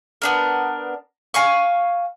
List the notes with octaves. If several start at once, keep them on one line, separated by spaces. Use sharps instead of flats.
B3 D4 A#4
F5 G#5 C#6